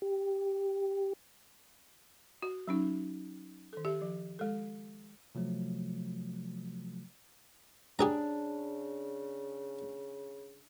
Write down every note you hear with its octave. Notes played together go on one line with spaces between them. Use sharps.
G4
F#4
F#3 C#4 D#4
D#3 A4
G4 E5
F3
G#3 A4
C3 F3 F#3 A3
C#3 D4 G4 G#4 A#5